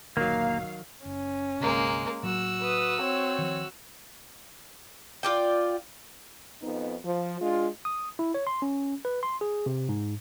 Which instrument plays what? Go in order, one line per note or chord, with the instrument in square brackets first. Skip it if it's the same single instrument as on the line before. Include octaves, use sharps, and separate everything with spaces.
[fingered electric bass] F#1 D2 A#2 [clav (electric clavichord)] D#3 F#3 [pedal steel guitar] A#3 [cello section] F5
[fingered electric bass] F#1 [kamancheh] C#4
[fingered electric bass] G1 C2 C3 [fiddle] G#3 A#3
[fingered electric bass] A2 F#3 A#3 [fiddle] F#4 E6
[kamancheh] B4 D#6
C4 C#5
[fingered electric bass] D#3 F3
[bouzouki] F4 D5 G5
[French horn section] F2 B3 D#4
F3
G#3 D4 F4
[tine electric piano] D#6
E4
C#5
C6
C#4
B4
C6
G#4
C3
G#2